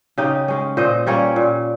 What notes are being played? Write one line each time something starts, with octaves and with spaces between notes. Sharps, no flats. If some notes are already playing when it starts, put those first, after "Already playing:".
C#3 D#4 G4
G#3 C#4
A#2 C5 D#5
G3 A#3 C#4 A#4 C#5
A#2